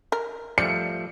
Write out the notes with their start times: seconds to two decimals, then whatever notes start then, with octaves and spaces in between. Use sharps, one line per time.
0.12 A#4
0.58 F3 G3 A3 D5 C#7